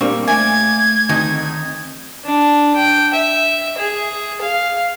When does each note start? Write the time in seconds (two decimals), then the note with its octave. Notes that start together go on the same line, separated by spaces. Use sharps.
0.01 A#2 G3 A#3 C4 C#6
0.27 A3 A#4 D5 E5 G#5 G#6
1.09 D2 D#3 C4 D#4 D#5
2.25 D4
2.75 G5
3.13 E5
3.78 G#4
4.41 F5